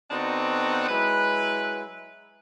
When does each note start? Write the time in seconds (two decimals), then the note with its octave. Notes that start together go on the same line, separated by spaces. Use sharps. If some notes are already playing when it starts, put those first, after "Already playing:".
0.11 D3 B3 C4 D4 D#4 F#4
0.89 F#3 G#3 E4 B4